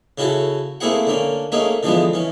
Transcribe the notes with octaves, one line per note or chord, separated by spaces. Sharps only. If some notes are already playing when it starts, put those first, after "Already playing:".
C#3 C#4 E4 F#4 A4
A3 A#3 C4 E4 G#4 F#5
D3 A#3 C#4
A3 A#3 C#4 D#4 G#4
D3 E3 F3 G#3 B3
E3 C#4